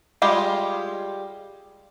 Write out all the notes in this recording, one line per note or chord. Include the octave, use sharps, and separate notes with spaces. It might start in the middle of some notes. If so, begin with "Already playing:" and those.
G3 G#3 F4 G4 G#4